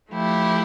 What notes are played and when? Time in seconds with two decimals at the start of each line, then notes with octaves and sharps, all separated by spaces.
0.12 F3 A3 E4 G4